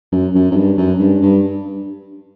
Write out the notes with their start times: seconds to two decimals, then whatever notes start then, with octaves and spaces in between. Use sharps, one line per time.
0.12 F#2
0.35 F#2
0.51 F#2
0.56 G2
0.78 F#2
0.99 G2
1.22 G2